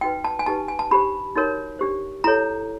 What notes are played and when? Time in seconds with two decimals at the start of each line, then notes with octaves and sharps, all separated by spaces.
0.01 D#4 F#4 B4 G5
0.24 A5
0.39 G#5
0.46 D#4 G4 B4 A5
0.68 G#5
0.79 A5
0.91 D4 G4 C5 B5
1.36 D#4 F#4 A#4 C#5
1.79 D4 G4 C5
2.24 E4 A4 C#5 A#5